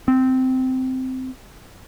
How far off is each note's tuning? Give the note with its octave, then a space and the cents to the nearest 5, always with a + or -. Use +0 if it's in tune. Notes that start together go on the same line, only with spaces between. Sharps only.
C4 -15